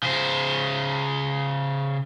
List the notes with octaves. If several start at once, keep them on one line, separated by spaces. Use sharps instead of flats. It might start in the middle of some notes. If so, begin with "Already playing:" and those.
C#3 C5